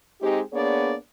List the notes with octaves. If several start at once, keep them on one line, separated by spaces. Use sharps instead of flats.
G#3 C4 D#4 G4
A#3 B3 D4 G#4 C#5 D5